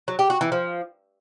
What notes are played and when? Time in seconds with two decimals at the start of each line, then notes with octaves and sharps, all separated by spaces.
0.08 F#3
0.19 G4
0.30 F#4
0.41 E3
0.52 F3